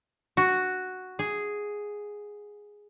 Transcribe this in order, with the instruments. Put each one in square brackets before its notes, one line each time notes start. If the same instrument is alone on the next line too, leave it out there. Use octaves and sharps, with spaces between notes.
[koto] F#4
G#4